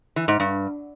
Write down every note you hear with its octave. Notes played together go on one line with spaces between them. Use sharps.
E3
G#2
G2